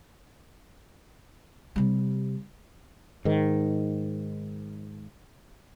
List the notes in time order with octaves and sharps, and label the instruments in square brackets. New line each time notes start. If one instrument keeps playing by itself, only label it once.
[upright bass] C3 G3
[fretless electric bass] G#2 D#3